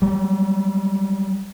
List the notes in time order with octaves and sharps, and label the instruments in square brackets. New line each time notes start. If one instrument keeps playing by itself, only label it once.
[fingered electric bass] F#3 G3